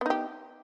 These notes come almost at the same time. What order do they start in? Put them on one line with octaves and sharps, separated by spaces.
B3 D#4 G4